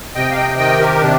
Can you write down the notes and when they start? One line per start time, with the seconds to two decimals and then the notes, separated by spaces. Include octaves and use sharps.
0.15 C3 D#5 G5
0.31 F5
0.36 D#5 G5
0.58 D#3 D#5 G5
0.79 G4 A#4
1.01 C3 D4